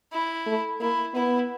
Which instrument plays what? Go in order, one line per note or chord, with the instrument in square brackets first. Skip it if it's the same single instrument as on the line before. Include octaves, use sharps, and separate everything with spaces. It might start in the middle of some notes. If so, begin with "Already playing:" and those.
[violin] E4
[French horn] A3
[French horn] A#3 [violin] E4
[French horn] B3 [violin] E4